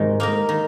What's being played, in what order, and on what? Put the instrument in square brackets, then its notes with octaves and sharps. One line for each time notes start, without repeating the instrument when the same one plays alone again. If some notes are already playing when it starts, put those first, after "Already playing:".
Already playing: [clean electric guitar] G#2 [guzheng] C3 D#3 G#3 F#4
[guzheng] A#3 D#4 A#4
D#3